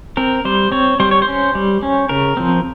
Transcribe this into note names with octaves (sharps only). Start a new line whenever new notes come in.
C4 A#4
G3 C5
C4 C#5
G3 C5
C#5
C5
C#4
G3
C#4
C#3 A#4
F3 C4